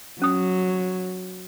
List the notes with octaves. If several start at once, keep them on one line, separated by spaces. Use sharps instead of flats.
F#3 C#4 D#6